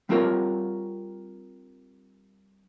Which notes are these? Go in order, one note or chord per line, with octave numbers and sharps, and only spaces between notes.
G3 C4 D4 F4 A#4 C#5